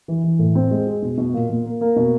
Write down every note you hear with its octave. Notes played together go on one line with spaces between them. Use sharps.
E3
E3
A2
C4
G#3
G#4
B2
B2
A#2
A#2
A#3
A#3
B2